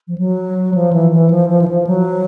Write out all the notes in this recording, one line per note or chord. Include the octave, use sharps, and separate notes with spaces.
F3
F#3
F3
E3
E3
F3
F3
E3
F3
F#3